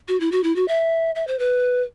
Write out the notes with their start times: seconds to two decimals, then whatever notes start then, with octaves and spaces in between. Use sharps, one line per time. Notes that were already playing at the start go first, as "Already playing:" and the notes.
0.08 F#4
0.20 E4
0.32 F#4
0.44 E4
0.56 F#4
0.68 E5
1.15 E5
1.27 C5
1.39 B4